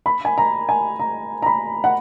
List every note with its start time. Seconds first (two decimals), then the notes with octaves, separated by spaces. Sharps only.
0.06 B5
0.25 G#5
0.38 A#5
0.69 G#5
1.00 A#5
1.42 A#5
1.46 B5
1.84 F#5